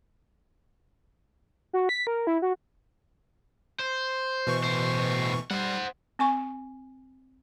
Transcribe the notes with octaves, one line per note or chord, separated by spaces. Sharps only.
F#4
B6
A#4
E4
F#4
C5
B2 E3 C#6
A2 C5
G3 C5 F#5
C4 G#5 C#6